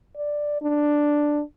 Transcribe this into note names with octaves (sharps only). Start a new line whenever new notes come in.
D5
D4